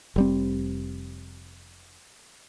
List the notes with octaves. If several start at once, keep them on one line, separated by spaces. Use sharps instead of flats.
F1 G3 C4